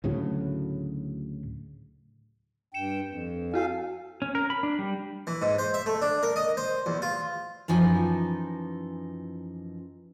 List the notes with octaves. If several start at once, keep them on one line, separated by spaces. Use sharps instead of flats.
D2 A2 C#3 F#3
G2 G5 C#7 E7
F2
E4 F#4 A4 F5 G#5
C#4
A#4
B5
D4
G3
E3
G#2
C5
E5
A3
D4
A#4
D#5
C5
E2
F4
F#2 E3 F3 D#4 G#5